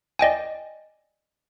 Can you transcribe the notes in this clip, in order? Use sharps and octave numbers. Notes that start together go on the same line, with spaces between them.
D5 D#5 G5 G#5